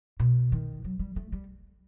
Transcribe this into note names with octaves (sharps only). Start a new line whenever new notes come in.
B2
D#3
F#3
G3
A3
G3